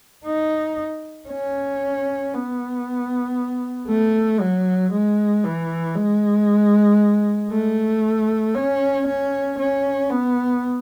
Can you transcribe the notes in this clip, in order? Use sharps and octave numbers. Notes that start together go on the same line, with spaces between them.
D#4
C#4
B3
A3
F#3
G#3
E3
G#3
A3
C#4
C#4
C#4
B3